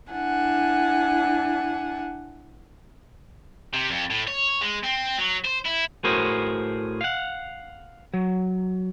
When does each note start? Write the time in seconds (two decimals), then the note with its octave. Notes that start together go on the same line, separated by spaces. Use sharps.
0.11 D4 E4 F#5 G#5
3.73 C3
3.91 F2
4.10 A2
4.27 C#5
4.61 G#3
4.83 C4
5.19 F#3
5.45 C5
5.66 E4
6.04 A2 F#4 G#4 A#4 C5
7.01 F5 F#5
8.14 F#3